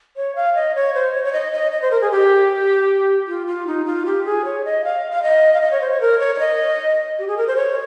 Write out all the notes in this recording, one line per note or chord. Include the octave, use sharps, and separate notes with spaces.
C#5
F5
D#5
C#5
C5
C#5
C#5
D#5
D#5
D#5
C5
A#4
G#4
G4
F4
F4
D#4
F4
G4
G#4
C#5
D#5
F5
F5
D#5
F5
D#5
C#5
C5
C#5
A#4
C#5
C#5
D#5
G4
G#4
A#4
C5
C#5